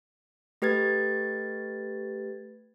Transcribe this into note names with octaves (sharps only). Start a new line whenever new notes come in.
A3 G4 B4 G#6 A6